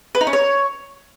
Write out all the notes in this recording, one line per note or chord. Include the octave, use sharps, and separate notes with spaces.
B4
D#4
C#4
C#5